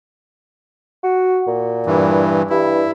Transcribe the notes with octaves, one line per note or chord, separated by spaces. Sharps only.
F#4
A#2
G2 E3
G2 E4